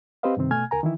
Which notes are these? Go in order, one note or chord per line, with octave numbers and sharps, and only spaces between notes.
C4 G4 B4 C5 D#5 F5
G2 C3 D#3 C4
B2 A3 G#5 F6 G#6
C#2 A#4 G#5 A#5
D#3 E3 E4